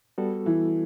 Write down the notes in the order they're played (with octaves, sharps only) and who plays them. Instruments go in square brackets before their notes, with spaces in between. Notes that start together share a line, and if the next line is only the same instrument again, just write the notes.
[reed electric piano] G3 B3 F#4 A4
[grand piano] E3